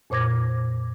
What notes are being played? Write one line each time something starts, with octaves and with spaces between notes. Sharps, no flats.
F2 A#2 C5 D6 G#6 A#6